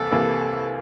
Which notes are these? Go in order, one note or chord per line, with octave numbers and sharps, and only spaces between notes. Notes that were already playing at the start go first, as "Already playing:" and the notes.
Already playing: C2 C3 E3 A#3 A4
C2 C3 E3 A#3